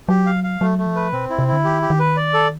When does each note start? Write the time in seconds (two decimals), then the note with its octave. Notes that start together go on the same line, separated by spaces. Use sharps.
0.09 F#3 G4
0.26 F5
0.44 F5
0.61 F#3 A3
0.78 A3
0.86 F3
0.96 B4
1.13 B2 C4
1.30 E4
1.39 C3
1.48 D3 E4
1.64 D#3 G4
1.82 G4
1.90 D#3
1.99 B4
2.16 D5
2.34 A4